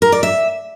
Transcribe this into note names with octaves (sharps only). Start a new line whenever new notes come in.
A#4
D5
E5